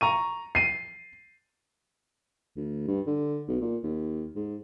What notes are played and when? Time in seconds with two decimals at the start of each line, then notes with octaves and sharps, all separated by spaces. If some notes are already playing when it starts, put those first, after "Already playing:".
0.01 A#5 C#6 D#7
0.55 C7 D#7
2.56 D2
2.87 G2
3.07 D3
3.48 B1
3.61 A#2
3.83 D#2
4.35 G#2